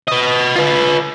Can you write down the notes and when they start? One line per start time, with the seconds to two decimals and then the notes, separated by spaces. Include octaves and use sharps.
0.08 B4 D#5
0.56 F4 B4